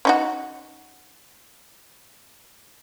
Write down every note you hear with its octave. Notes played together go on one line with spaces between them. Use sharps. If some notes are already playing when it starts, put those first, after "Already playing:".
C#4 D#4 F#4